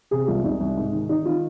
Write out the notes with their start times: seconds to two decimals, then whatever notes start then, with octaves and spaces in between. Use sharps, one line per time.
0.11 C3 G#4
0.27 C2 F4
0.44 C2 D#4
0.60 C2
0.77 G#2
0.92 D#3
1.09 D#3 D#4
1.25 D#3 F4